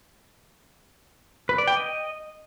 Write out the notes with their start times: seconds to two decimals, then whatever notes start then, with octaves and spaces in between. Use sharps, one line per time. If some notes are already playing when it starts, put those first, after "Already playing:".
1.49 B4
1.58 D5
1.67 G5
1.77 D#5